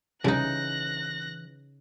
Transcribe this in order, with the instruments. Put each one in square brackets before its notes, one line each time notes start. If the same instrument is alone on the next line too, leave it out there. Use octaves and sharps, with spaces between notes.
[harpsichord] C2 F2 [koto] C#3 D#4 [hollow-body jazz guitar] E3 [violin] F#6 A#6